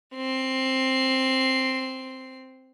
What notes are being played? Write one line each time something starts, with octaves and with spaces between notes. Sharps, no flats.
C4 C7